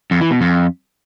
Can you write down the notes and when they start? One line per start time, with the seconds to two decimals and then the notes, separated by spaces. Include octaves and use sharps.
0.11 F2
0.21 E3
0.31 B2
0.41 F2